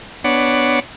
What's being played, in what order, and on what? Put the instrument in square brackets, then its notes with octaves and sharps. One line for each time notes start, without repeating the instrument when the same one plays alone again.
[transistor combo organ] B3 D4 C#5 F#5